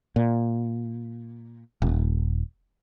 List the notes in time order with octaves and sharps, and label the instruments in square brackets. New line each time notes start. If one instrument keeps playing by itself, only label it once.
[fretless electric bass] A#2
D#1